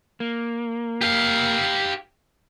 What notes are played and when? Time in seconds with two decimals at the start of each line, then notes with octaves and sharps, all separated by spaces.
0.20 A#3
1.01 G4 F5